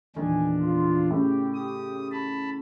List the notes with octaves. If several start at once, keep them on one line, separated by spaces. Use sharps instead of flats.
E2 A#2 D#3 D4 G#5
F4
A2 C#3 G4
D#6
A5 B5